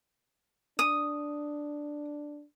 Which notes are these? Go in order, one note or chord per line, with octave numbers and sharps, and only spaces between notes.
D4 D#6